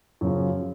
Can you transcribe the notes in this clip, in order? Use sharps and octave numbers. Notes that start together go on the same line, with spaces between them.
F#2 C#3 F3